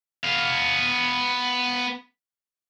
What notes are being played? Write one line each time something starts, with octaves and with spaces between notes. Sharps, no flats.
B3 F5